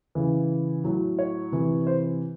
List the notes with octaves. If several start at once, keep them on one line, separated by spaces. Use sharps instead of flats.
C#3 E3
A2 F#3
C#5
C3 E3
C5